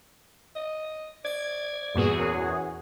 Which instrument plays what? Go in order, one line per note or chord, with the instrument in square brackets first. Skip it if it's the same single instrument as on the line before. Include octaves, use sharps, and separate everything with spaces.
[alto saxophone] D#5
[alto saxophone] D5 [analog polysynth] G#6
[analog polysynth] E2 F#4 G#4 [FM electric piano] G2 A#2 B3
[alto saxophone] C#4 [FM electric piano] A#4